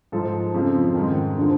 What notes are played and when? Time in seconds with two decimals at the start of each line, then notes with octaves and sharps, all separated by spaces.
0.12 G#2 F3 A4
0.54 F2 C#3 F3
0.95 G#2 D#3
1.38 D3 F3